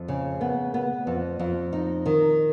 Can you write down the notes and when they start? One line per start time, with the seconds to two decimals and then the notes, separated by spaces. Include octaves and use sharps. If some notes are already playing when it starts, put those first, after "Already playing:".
Already playing: F2
0.08 C#3
0.41 B3
0.74 B3
1.07 F2
1.39 F2
1.73 D#4
2.06 D#3